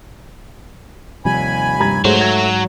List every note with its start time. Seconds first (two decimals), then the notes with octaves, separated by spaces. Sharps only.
1.25 D#2 C3 F3 G3 G#5 B5
1.80 G2 A#5 G#6
2.04 G#2 F#3 A3 G#4 C5
2.18 A3 G#6 G7